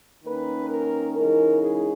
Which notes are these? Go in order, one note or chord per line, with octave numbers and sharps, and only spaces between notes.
D#3 A#3 C#4 B4
A#4
C#3 E3 G#3 D#4 A#4
G#4